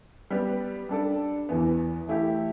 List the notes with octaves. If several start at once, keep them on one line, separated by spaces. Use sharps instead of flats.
G3 B3 G4 B4 D5
G3 D4 A4 D5
E2 E3 B3
E3 A3 E4 G4